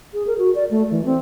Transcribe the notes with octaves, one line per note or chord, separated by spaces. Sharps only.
G#4
A#4
F#4
D5
A3
E3
C4